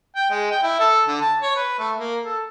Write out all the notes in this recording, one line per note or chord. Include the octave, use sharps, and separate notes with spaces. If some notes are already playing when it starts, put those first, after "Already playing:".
G5
G#3
G5
E4
A4
D3
A5
C#5
B4
A3
A#3
A4